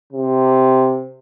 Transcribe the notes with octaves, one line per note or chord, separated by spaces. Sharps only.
C3